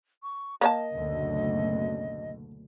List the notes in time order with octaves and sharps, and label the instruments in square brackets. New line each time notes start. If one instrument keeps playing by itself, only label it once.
[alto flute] C#6
[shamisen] A#3 C#5 A5 [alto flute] D#5
[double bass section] F#1 D2 B2